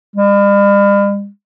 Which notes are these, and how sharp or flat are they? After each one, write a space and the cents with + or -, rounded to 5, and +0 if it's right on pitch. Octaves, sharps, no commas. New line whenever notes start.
G3 +45